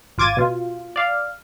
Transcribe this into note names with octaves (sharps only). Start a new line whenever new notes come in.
G#1 F4 D6 G#6 A6 D#7
B2 F4
D5 F5